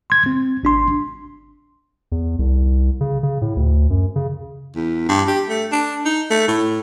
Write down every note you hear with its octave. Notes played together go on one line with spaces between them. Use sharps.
C6 G#6
C4
G#1 D4 C6
E2
C2
C#3
C#3
A2
D2
F#2
C#3
E2
G2
G4
A3
D4
D#4
A3
A2